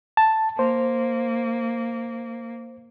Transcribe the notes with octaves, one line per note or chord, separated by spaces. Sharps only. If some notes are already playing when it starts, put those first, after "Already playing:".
A5
A#3 C5